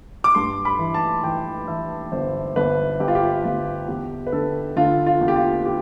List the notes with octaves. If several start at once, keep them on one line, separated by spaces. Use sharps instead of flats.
D6
G2 C6
B5
E3
A5
E3 G5
E3 E5
G1 C5
G1 B4
G1 G4
F4
G4
G1 F4
E2 G4
B4
D3 A4
D3 F4
F4
E2
G4
F4
G4